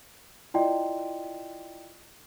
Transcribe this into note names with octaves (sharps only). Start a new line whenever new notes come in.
E4 F4 D5 D#5 G5 C6